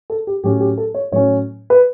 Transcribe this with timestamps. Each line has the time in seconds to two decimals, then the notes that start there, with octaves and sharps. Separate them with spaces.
0.10 A4
0.27 G4
0.43 A2 F#3 C#4 G4
0.60 G4
0.78 A4
0.95 C#5
1.12 A2 F#3 C#4 C#5
1.70 B4